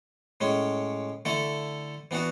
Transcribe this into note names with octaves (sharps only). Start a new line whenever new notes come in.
A2 G#3 C#4
D3 A3 E4 A4
E3 B3 D4 F#4